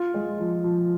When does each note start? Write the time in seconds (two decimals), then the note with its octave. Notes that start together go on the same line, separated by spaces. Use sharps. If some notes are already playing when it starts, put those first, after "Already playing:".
Already playing: F4
0.14 G#3
0.39 F3
0.64 F3